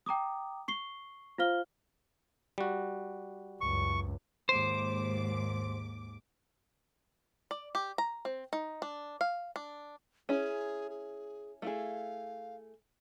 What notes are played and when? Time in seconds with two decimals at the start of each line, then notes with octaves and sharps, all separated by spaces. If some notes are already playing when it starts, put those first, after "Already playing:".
0.06 G5 A#5 D6 D#6
0.68 C#6 C7 G7
1.38 F4 C5 F5 F6 G7
2.58 G3 F#4
3.61 C#2 F#2 C#6
4.49 D#2 G#2 C5 D6
7.51 D5
7.75 G4
7.98 A#5
8.25 C4
8.53 D#4
8.82 D4
9.21 F5
9.56 D4
10.29 C#4 E4 G#4
10.90 G#4
11.62 A3 E4 G#4 F5